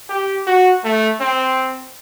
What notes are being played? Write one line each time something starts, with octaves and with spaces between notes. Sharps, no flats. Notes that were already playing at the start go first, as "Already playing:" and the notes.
G4
F#4
A3
C4